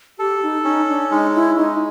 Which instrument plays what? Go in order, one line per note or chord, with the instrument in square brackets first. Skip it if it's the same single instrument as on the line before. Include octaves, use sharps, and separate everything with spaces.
[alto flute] G4 [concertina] A4
[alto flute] D#4
[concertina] C#4 [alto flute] D#4
[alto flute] D4
[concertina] G#3 [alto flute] D#4
[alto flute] E4
[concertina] G#3 [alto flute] D#4